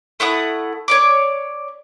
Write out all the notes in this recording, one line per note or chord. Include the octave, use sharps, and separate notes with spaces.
A3 E4 F#5 D#6
C#5 D5 D6